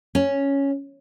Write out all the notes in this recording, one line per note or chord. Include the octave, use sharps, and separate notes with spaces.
C#4